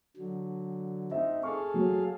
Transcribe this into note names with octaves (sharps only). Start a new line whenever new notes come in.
D3 F#3
C4 D#4 E5
G#4 A4 F5 C#6
F#3